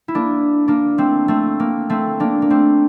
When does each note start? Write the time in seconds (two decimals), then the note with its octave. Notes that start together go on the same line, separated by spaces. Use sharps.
0.08 E4
0.15 A#3 D4
0.68 A#3 D4
0.98 A3 C4
1.28 A3 C4
1.60 A#3
1.90 A3 C4
2.20 A#3 D4
2.42 A#3
2.50 A3 C4